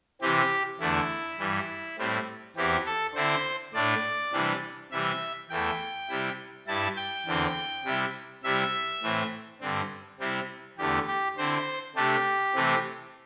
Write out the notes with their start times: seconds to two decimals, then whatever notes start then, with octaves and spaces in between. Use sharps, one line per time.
0.22 C3 E3 C4 G4
0.80 E2 D3 A3 D4 E4
1.39 G2 E3 G3
1.98 A2 G3 C4 E4
2.56 E2 E3 C4 E4 G4
2.86 A4
3.15 D3 C4 E4 C5
3.74 A2 A3 D4 D5
4.33 C3 E3 G3 D4
4.91 C3 E3 G3 C4 E5
5.50 E2 E3 A3 E4 G5
6.09 C3 G3 E4
6.67 G2 G3 E4 A5
6.97 G5
7.26 E2 D3 C4
7.85 C3 G3 E4
8.44 C3 G3 E4 E5
9.02 A2 E3 C4
9.61 G2 D3 C4
10.20 C3 G3 C4 E4
10.78 E2 D3 A3 G4
11.08 G4
11.37 D3 C4 E4 C5
11.96 C3 A3 D4 G4
12.54 C3 E3 A3 C4